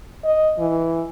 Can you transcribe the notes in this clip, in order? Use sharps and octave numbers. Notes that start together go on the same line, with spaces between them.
D#5
E3